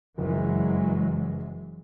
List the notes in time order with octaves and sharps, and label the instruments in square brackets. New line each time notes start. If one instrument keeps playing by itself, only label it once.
[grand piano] F#1 F2 [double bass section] E3 F#3 G#3